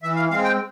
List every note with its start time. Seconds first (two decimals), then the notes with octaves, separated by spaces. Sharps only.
0.03 E3 E5
0.16 F5
0.30 G#3 C4 F5
0.44 G5